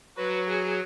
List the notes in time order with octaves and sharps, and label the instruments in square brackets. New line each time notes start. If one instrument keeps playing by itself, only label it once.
[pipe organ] F#3 F#4 [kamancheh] B4
[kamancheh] G#4